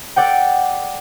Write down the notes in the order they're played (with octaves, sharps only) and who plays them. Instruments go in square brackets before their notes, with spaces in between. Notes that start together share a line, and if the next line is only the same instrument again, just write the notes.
[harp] A4 D5 F#5 G5